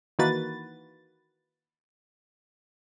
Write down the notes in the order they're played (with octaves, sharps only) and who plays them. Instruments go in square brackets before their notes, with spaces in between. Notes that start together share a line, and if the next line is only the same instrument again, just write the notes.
[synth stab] D#3 E3 A#3 F#4 B4 A6